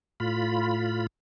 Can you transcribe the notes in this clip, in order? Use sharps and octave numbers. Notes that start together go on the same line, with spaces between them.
A2 F4 B5